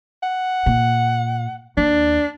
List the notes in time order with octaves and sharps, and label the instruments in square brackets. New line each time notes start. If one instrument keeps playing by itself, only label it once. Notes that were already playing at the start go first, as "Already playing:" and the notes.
[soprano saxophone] F#5
[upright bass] A#2
[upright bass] D#2 [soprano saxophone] D4